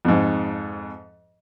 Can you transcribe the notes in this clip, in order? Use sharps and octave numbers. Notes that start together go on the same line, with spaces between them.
F2 G#2